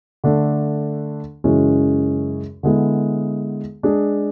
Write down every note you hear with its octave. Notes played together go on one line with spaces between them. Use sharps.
D3 A3 D4
F#2 C#3 E3 G#3 C#4
D3 G#3 B3 E4 G#4
G#3 D4 G#4